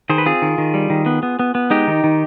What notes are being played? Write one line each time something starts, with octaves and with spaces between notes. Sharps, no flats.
D#3 G#4 C5
B4
C4 F4 G#4
D#3
D#3
G3
D#3
B3
B3
B3
B3
G#3 D#4 G4
D#3
D#3